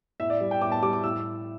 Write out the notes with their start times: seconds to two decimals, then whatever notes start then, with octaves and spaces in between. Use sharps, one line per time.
0.20 A2 E5
0.30 D5
0.41 G3
0.51 G5
0.62 A2 D6
0.72 A5
0.82 G3 D6
0.93 D6
1.04 A2 E6